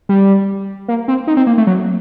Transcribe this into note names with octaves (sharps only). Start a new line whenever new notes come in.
G3
A#3
C4
D#4
C4
A#3
A3
F#3